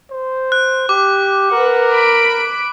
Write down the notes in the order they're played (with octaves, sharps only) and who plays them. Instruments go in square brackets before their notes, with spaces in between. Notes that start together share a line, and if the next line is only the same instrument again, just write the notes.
[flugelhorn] C5
[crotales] F#6
[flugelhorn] G4 [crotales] D6
[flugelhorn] A#4 [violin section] B4 F#5
[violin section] B5 D7